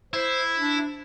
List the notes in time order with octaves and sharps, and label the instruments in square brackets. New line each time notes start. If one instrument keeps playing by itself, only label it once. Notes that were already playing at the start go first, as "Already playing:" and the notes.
[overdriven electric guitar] E4 [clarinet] C5
[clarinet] D4